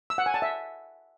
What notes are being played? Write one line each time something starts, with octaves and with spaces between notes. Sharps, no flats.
E6
F#5
G#5
A5
E5